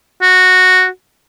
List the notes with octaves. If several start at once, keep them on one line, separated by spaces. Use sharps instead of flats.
F#4